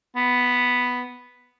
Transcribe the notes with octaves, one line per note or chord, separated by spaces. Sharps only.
B3